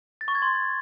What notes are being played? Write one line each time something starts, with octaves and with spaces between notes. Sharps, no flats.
A6
C#6
G#6
C6